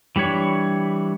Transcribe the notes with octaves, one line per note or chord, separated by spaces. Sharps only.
E3 G3 D4 C#5 B5